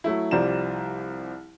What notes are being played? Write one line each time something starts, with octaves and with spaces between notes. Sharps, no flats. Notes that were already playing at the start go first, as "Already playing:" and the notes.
F#3 A3 E4
C2 F3 G3 D5 A#5 E7